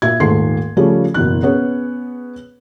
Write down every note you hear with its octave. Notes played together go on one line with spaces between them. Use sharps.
A#2 E5 G#6
D#1 G#2 A3 C6 C7
C#3 F3 G3 A3 C#4 G#4
F#1 B2 E3 F#6
B3 C#4 G#4 B4 C#5